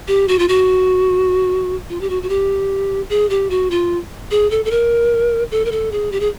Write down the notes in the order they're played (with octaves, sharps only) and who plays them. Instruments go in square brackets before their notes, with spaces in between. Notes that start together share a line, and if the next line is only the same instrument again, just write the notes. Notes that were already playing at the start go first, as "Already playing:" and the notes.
[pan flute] G4
F#4
F4
F#4
F4
G4
F#4
F#4
G4
G#4
G4
F#4
F4
G#4
A4
A4
A#4
A4
A#4
A4
G#4
G4
G#4